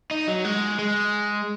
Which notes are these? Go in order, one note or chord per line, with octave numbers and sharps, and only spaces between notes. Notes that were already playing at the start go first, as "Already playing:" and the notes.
D#4
F#3
G#3
G#3